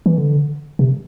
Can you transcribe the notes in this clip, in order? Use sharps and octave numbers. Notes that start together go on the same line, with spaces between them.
E3
D3
C3